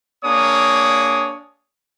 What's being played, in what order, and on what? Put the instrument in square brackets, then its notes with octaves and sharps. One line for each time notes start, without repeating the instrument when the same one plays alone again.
[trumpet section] A#3 D4 G#4 C#5 D#6